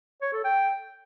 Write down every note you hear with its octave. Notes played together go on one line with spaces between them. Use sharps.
C#5
A4
G5